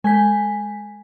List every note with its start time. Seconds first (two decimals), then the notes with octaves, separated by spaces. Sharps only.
0.04 G#3 G#5 G6 B6